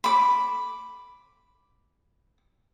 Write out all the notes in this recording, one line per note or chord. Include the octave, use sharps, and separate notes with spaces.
B5 D6